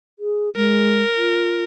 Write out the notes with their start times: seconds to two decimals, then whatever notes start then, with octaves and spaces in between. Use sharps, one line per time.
0.19 G#4
0.56 G#3 A#4
1.17 F4